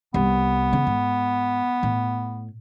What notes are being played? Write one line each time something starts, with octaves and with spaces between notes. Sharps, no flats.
C2 B3
C#3
G#2
A2